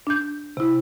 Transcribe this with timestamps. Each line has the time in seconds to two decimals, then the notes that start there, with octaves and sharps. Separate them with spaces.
0.07 D4 G6
0.57 C3 E4